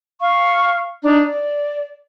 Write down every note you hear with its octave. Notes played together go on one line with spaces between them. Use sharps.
F5 C#6
D4 D#4 A#5
D5